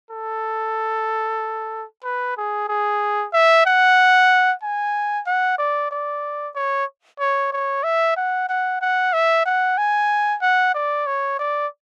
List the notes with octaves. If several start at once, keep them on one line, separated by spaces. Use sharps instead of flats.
A4
B4
G#4
G#4
E5
F#5
G#5
F#5
D5
D5
C#5
C#5
C#5
E5
F#5
F#5
F#5
E5
F#5
G#5
F#5
D5
C#5
D5